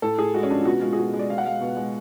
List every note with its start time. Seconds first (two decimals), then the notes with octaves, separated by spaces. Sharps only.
0.02 A2 A4
0.18 A2 G#4
0.34 G#3 F#4
0.43 C#4
0.50 F3 D4
0.58 F4
0.65 B2 F#4
0.81 G#3 F4
0.93 G#4
0.97 B2 F#4
1.13 G#3
1.19 D5
1.30 B2 F5
1.38 F#5
1.45 G#3 F5
1.61 B2
1.76 G#3